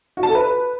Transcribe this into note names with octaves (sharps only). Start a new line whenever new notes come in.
F#4
A5
A4
B4